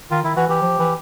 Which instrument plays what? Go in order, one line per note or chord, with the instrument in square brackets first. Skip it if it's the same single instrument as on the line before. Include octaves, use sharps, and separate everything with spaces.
[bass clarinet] D#3 [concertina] F4
[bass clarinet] D#3 [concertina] E4
[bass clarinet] E3 [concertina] F#4
[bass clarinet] E3 [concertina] G4
[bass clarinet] F3
E3